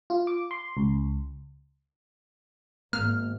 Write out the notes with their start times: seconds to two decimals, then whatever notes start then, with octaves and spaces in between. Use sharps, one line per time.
0.10 F4
0.27 D6
0.51 C6
0.77 C#2
2.93 G#1 A#3 F6